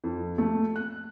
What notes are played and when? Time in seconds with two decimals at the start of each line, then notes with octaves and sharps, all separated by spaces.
0.04 F2
0.38 A3
0.76 F#6